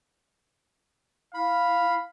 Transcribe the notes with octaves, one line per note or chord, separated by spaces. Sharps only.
E4 F5 B5